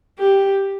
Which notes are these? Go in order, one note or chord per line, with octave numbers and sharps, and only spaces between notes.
G4